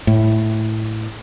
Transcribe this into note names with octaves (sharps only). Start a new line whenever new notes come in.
A2